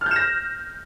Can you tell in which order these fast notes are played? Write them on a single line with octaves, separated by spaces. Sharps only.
F6 G6 E7 A#6